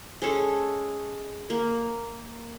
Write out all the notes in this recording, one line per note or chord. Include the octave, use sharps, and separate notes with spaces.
G#3 C#4 A4
A#3